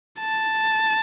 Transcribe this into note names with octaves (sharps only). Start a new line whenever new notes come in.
A5